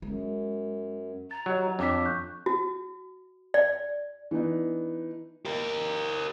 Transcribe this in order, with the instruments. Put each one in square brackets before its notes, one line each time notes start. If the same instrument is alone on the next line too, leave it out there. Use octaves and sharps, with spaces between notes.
[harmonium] F#2 [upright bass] G#3
[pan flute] A#5 [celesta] A6
[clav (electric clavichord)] F#3 [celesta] G4 D#5
[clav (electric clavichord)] F2 [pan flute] D4 [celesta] C#5 D6 B6
[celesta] C#6 F#6 G6
[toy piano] F#4
D5
[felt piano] E3 B3 D4 D#4
[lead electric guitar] G4 A#4